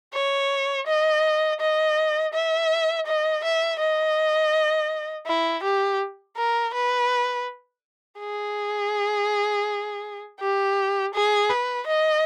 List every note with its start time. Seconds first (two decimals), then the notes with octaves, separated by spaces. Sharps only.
0.13 C#5
0.87 D#5
1.60 D#5
2.33 E5
3.06 D#5
3.44 E5
3.79 D#5
5.26 E4
5.63 G4
6.37 A#4
6.73 B4
8.19 G#4
10.40 G4
11.14 G#4
11.50 B4
11.87 D#5